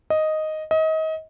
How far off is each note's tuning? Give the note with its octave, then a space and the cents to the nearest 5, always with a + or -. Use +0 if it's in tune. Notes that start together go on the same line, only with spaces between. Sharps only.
D#5 +0
D#5 +30